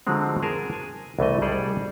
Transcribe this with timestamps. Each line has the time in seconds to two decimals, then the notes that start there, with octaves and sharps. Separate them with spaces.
0.07 D3 F3 F#3 G#3 C4
0.42 G#4 A#4 A5
0.73 G#5
1.19 C2 E3 A3 D#5
1.42 G3 G#4 A4 D5 D#5